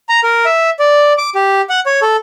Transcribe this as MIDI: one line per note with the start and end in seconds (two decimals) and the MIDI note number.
0.09 0.20 82
0.23 0.45 70
0.46 0.70 76
0.79 1.13 74
1.18 1.30 86
1.35 1.61 67
1.70 1.80 78
1.86 2.00 73
2.02 2.17 69